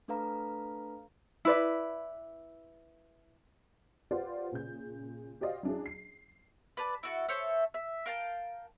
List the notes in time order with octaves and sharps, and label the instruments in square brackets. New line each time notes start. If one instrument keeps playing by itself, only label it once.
[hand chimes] A3 D4 A4 B4 F5 A#5
[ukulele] E4 B4 D5
[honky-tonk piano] F4 G4 B4 C5 D5 F#5
A#2 C#3 G6
F#4 G4 C5 D5 D#5 F5
F#3 C#4 D4 E4 G#4
C7
[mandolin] B4 D5 A5
E4 F#4 A4
A4 C5 C#5 E5
E5
A#4 F5 G5 A5